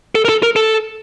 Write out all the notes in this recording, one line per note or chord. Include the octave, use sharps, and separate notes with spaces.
A4
A#4
A4
A#4
A4